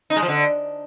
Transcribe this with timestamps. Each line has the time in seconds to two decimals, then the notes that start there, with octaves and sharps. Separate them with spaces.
0.10 D#4
0.16 G#3
0.22 F3
0.28 D3